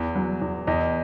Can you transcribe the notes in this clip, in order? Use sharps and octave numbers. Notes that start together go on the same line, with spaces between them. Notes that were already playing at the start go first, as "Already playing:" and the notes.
Already playing: E2 E3
F#3
E2
E2 D#5